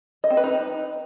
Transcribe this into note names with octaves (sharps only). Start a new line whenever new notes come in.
D#5
C4
B4
D#4